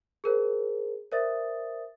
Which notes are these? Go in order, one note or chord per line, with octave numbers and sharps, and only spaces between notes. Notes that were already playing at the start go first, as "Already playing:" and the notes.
G#4 A#4 C5
A#4 C5 D5 E5 D#6 A6